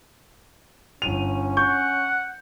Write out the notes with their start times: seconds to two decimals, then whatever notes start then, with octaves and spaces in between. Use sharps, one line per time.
1.02 G1 C#4 D#7 F7
1.57 F#5 C#6 G6